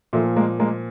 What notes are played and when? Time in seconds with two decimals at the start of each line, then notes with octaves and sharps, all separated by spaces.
0.13 A#2 F3 A3
0.36 G#3 A#3
0.60 G#3 A#3